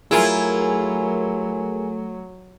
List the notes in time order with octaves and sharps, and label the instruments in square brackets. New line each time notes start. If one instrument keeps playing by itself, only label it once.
[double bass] F#3 [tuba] A3 [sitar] E4 F4 [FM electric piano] G#4 A#4 G#5